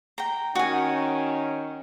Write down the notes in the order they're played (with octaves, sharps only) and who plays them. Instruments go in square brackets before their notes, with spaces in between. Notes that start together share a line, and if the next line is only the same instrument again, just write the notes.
[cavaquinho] G5 A#5
[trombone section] D#3 C#4 [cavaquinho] F#4 G#5